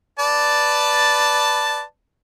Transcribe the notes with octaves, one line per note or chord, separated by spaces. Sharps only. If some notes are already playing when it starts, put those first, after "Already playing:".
B4 D5 A5